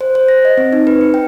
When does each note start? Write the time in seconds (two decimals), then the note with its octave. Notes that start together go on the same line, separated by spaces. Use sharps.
0.01 C5
0.15 C5
0.28 A#6
0.45 D#5
0.57 C4
0.73 D#4
0.87 B4
1.01 C#7
1.14 G5